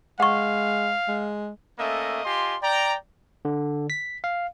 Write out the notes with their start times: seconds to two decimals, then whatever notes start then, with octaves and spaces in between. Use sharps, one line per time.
0.20 G#3 F5 F#5 C#6
1.08 G#3
1.79 A3 A#3 C#4 A4 D#5 E5
2.25 F4 G4 D#5 G#5 C6
2.62 D5 G5 A#5
3.45 D3
3.90 B6
4.24 F5